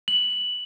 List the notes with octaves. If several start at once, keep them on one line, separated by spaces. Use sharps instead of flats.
F#7